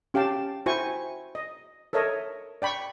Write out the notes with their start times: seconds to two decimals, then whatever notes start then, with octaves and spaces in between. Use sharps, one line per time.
0.14 C#4 G4 F5 G5 A5
0.66 E4 F#4 C5 G5 G#5 C#6
1.35 D#5
1.93 A4 A#4 C#5 D#5 E5
2.62 D5 G5 B5 C#6